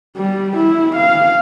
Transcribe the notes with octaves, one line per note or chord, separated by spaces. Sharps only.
G3
E4
F5